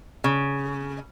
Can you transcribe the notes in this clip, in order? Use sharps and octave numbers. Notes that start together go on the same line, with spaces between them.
C#3